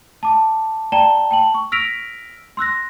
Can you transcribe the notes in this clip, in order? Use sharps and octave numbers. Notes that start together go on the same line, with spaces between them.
A5 D6
D5 G5 A5 A#5 E7 G7
G5 A5 F#7
C#6
E6 F6 A#6 B6 D7 F7
C6 E6 F#6 A#6